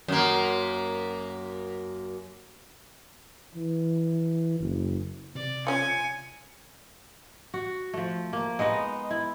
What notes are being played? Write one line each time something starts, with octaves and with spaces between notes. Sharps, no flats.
F#2 A#3
E3
F#1
C3 D5
F3 C#4 F4 G#5 C#7
F#4
F3 A3
A#3
G#3 B3 D#4 D#5
E4